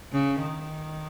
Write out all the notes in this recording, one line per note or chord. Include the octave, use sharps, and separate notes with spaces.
C#3
D#3